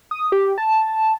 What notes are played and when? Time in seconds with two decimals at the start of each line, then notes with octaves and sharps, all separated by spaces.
0.11 D#6
0.32 G4
0.58 A5